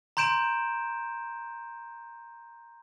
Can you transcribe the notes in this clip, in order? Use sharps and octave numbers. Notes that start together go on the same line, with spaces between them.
A#5 C6 G6 D7 E7